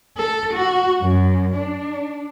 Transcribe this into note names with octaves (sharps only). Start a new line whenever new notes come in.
A4
F#4
F#2
D4